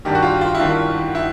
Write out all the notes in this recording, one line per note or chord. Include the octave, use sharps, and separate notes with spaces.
G#1 G2 D#3 G4
F#4
F4
F4
E4
G#1 G2 D#3 F4
E4